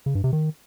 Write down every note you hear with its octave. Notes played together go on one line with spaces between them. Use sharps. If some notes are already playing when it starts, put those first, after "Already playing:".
C#3
G2
C3
D#3